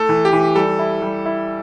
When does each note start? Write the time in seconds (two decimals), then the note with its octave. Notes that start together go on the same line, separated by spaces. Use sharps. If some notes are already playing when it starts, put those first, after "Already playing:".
Already playing: A3 E4 A4
0.09 E3
0.25 G4
0.33 E3
0.56 G3 A4
0.79 E4
1.02 G3
1.26 E4